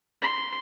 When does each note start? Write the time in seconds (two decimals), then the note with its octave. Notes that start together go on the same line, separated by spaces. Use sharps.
0.22 C6